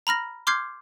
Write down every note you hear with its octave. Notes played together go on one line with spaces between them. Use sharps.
A#5 B5 F6 A#6
C6 D6 F6 G6 G#6 C7